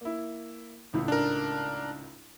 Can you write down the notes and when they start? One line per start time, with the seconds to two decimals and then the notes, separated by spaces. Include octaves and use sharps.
0.01 A#3 E4
0.93 G#1 C#2 A2
1.08 D4 A#4